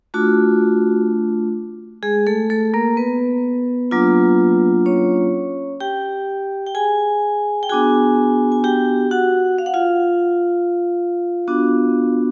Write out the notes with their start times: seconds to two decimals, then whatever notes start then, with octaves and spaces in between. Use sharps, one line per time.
0.14 A3 D4 F4 F#4
2.03 G#3 G#4
2.27 A3 A4
2.50 A3 A4
2.74 A#3 A#4
2.97 B3 B4
3.91 F#3 A#3 D4 F4
4.86 C#4 C#5
5.80 G4 G5
6.67 G5
6.75 G#4 G#5
7.63 G5
7.69 B3 D4 F#4 G#4 G#5
8.52 G#5
8.64 G4 G5
9.11 F#4 F#5
9.58 F5
9.66 F#5
9.74 F4 F5
11.48 B3 D4 F#4